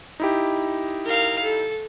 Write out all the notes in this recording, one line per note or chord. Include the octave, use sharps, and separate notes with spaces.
D#4 E4 G4
A#4 F5
A4